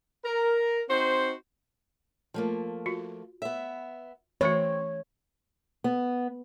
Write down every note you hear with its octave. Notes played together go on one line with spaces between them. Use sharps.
A#4
C4 D#4 F#4 C5
F3 A3 A#3
F4 F#4
B3 E5
E3 A3 C4 F#4 C#5
B3